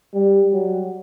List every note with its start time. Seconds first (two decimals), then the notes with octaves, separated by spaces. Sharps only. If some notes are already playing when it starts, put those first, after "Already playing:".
0.14 G3
0.53 F#3